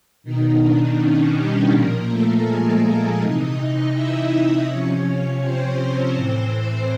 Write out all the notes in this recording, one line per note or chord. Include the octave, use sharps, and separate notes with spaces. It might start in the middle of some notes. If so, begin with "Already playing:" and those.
B2 D#3 D#4
D4
C#4
G3 G4
A#2 F3 A#3 A#4
A3 A4
G#3 G#4
A3 A4
C3 E3 D#4 D#5
E4 E5
C3 F3 C#4 C#5
C4 C5
A2 E3